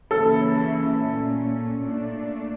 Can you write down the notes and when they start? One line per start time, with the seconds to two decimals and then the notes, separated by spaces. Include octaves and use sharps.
0.11 C#3 E3 A#3 C#4 E4 A4
0.97 A#2 A3 C#4
1.83 A#2 A3 D4